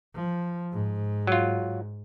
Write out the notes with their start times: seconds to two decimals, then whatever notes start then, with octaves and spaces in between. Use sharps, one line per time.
0.15 F3
0.73 G#2
1.27 F#3 F4